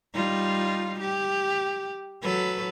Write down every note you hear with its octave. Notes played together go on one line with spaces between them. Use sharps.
G3 D#4 F4
G4
F#3 A4 B4